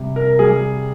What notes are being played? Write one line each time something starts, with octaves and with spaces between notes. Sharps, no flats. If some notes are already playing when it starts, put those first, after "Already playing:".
Already playing: C3 G3
A#4
G3 G#4